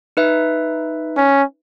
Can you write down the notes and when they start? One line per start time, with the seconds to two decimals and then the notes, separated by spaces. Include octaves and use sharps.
0.17 D#4 B4 E5
1.17 C#4